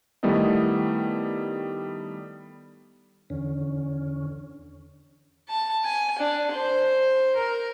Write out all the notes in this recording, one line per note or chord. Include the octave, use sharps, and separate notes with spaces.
D#3 G3 A3 B3 E4 D#5
E2 D3 C#4
A5
G#5
D4
C5
A#4